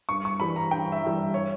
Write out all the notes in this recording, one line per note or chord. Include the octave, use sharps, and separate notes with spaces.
G2 C#6
C#6
E3 G3 B5
A#5
G2 G5
E5
E3 G3
E5
C#5